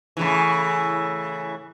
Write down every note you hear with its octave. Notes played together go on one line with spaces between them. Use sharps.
A2 C#3 E3